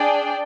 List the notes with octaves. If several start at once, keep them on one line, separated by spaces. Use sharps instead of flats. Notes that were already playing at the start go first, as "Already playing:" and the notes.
Already playing: D4 G#4 D5 G5